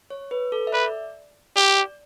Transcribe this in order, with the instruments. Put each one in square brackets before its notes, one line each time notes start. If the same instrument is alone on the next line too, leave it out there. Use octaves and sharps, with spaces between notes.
[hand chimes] C#5
B4
A4
E5
[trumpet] B4 [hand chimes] D5
[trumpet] G4 [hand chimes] D5